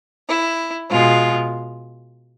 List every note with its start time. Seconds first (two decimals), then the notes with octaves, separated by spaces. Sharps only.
0.29 E4
0.89 B2 G#3 F4